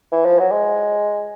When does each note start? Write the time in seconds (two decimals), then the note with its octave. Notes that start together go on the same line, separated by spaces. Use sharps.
0.12 E3
0.26 F3
0.39 F#3
0.52 G#3